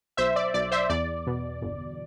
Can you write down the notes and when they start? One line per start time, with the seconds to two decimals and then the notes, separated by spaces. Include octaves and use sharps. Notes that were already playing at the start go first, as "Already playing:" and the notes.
0.17 B1 C5 E5
0.36 D5
0.54 B1 D5
0.71 C5 E5
0.89 E2 D5
1.27 B2
1.62 G1